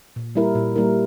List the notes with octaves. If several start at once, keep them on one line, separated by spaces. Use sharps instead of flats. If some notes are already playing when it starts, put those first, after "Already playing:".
A#2
G3 A#3 E4 A#4
A#2
G3 A#3 E4 A#4